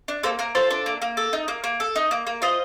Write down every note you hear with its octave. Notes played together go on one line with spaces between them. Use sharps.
D4
A#3 A4 C5
A#3 A#4
F4 A4 C5
D4
A#3
A#3
A4
D#4
A#3
A#3
A4
D#4
A#3
A#3
F4 C5 D#5